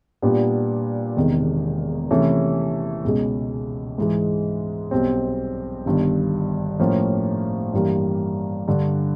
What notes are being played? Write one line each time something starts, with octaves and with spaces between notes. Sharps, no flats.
A#2 G3 B3 D4 G4
E1 E2 C3 D#3
C3 E3 A3 C#4 E4
C#2 B2 G#3
G#2 E3 G#3
B1 B2 G3 C4
G1 G2 D#3
A2 F3 A#3 C#4
G2 E3 G3 A#3
G2 D3 G3